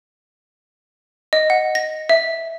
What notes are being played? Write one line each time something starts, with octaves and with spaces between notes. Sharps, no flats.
D#5
F#5
A#6
E5